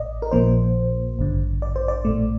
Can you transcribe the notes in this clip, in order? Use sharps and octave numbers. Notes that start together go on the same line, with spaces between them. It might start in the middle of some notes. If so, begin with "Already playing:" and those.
Already playing: A1 A2 D5 D#5
A#4
A#1 A#2 F3 A#3 C5
A1 G2 D3
D5
C5
D5
A#1 A2 A3